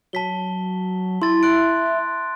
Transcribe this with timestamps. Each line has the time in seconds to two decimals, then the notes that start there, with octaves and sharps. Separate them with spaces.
0.13 F#3 A5 B6 G7
1.22 E4 C6 A6
1.43 C6 F#6 D7